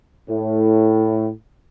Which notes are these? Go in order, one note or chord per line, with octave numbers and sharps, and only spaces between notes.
A2